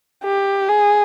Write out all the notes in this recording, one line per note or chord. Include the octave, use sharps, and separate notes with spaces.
G4
G#4